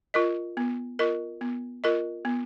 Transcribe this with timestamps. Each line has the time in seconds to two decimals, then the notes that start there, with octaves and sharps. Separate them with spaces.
0.14 F4 A#4 D#5
0.57 B3
0.99 F4 A#4 D#5
1.41 B3
1.84 F4 A#4 D#5
2.25 B3